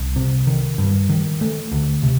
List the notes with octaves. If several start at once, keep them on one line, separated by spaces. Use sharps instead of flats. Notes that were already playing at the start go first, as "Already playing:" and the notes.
Already playing: C2
C3
D#3
G2
D#3
A3
D2
C3